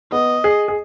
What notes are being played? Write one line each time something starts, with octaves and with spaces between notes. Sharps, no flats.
B3 D#5
G#4
G#4